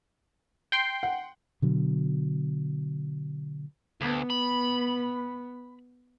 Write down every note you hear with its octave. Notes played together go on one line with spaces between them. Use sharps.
G5 C6
F#5
B2 D3 F#3
D2 B3
B5